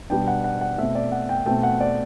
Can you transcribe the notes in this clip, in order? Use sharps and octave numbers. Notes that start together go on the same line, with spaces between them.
B2 G3 B3 D4 G5
F#5
F#5
F#5
B2 A3 C4 E5
D5
F#5
G5
B2 A3 C4 G5
F#5
D5